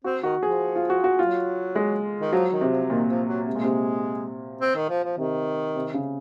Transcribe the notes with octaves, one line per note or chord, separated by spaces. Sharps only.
C4 F#4
D#3 F#4
F3 G#4
F4
F#4
F#4
F#3 F4
G#3
D#3
F3 F#3
D#3
C3
F3
A#2 D#3
F3
F#3
C3 G#3
A#2
C3
C4
D#3
F3
F3
C3 D#3
C3
C#3